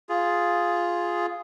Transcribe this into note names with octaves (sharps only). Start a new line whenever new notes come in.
F4 G#4